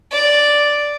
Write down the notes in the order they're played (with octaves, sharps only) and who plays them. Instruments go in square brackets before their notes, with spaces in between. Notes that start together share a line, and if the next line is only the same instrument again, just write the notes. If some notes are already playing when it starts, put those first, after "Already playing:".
[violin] D5